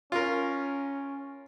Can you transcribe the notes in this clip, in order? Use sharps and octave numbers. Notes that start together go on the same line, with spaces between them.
C#4 F4 A#4